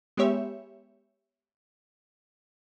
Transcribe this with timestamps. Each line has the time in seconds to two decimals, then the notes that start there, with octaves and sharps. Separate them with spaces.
0.17 G#3 B3 G4 C#5 E5